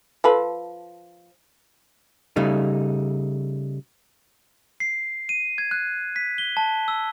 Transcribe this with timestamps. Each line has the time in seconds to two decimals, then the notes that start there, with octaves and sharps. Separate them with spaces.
0.24 F3 A4 B4
2.36 C#3 G3 A3 D#4
4.80 C7
5.29 D#7
5.58 G#6
5.71 F#6
6.16 B6
6.38 G7
6.57 A5
6.88 E6